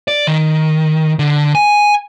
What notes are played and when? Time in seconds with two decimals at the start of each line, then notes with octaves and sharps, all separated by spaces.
0.08 D5
0.27 D#3
1.19 D3
1.55 G#5